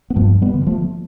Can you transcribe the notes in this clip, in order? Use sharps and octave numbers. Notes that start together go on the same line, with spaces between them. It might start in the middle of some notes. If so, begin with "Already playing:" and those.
B3
G2 F3 A3
G3 B3
D3
G3
F3 A3